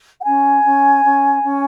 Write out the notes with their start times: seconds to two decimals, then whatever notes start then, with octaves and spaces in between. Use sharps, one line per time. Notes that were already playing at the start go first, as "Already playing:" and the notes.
0.20 F#5
0.25 C#4 G#5
0.64 C#4
1.04 C#4
1.43 C#4